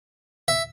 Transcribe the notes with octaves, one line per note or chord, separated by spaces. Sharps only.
E5